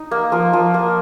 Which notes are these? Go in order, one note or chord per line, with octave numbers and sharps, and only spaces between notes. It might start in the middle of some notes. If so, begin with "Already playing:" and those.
Already playing: D#4
A#3
F3 A#4
F3
A#3